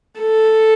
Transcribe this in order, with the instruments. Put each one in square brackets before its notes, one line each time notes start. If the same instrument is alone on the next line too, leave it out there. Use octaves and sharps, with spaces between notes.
[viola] A4